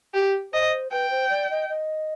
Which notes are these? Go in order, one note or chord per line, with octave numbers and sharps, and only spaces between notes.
G4
C5 D#5
B4 G5
C5
D5
D#5
D#5